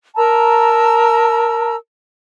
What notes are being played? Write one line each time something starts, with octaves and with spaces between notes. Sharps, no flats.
A#4 A5 A#5 E6